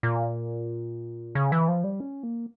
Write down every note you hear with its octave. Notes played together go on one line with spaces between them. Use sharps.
A#2
C#3
E3
F3
G3
C#4
A#3